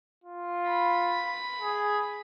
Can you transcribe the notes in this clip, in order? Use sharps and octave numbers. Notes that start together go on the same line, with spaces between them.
F4
B5
G#4